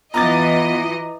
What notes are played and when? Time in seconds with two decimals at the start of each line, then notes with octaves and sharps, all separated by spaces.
0.14 E3 B3 F4 D#5 A#5 D6 A6